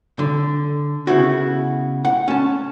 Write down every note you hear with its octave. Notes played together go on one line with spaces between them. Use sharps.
D3
C#3 B3 E4 F#4
F#5
C#4 A5